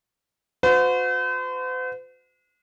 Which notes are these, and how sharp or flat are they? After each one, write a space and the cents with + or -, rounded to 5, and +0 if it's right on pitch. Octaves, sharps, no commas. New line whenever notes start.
F#4 -40 C5 -45